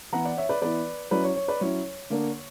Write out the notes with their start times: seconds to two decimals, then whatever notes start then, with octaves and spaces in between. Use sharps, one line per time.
0.12 E3 B3 E4 F#5 A#5
0.25 D5 F#5
0.37 C#5 E5
0.49 B4 D5
0.62 E3 B3 E4 B4 D5
1.11 F#3 C#4 E4 B4 D5
1.24 C#5
1.36 C#5
1.48 B4 D5
1.60 F#3 C#4 E4 C#5
2.10 D3 A#3 D4